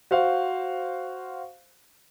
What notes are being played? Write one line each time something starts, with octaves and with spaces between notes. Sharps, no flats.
F#4 C5 F5